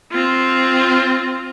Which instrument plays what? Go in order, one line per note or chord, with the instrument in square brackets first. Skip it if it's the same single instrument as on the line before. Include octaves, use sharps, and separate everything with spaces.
[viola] C4 F4